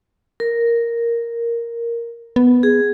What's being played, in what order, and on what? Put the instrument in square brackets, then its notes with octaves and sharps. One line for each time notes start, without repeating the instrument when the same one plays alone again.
[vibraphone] A#4
[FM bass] B3
[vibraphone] G#4